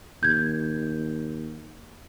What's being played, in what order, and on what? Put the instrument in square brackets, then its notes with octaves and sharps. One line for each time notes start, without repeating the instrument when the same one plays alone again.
[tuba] D#2 [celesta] G6 G#6